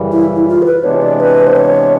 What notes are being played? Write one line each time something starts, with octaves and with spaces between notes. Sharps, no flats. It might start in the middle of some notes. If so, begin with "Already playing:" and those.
Already playing: F#2 C#3 E3 G3
E4
E4
F4
C5
B4
C3 E3 G#3 B3 D4 C#5
D5
B4
C5
C#5